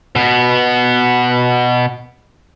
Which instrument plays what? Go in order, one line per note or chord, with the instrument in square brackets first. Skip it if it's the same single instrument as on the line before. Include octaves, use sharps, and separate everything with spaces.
[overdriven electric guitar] B2 B3